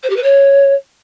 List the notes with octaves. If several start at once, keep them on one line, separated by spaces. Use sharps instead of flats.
C5
G4
B4
C#5